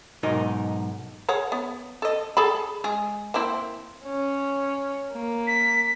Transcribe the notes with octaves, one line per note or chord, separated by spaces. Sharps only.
B1 G#2 D#4 A#4 D#5
G#4 C#5 F#5
B3
A4 D#5
G#4 A4 B5
G#3 G#4
A#3 C4 E4
C#4
A#3
B6